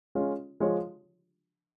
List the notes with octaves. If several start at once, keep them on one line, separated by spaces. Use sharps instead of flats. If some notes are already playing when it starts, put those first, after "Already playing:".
G#3 C#4 F4 C#5
F3 G#3 F4 C#5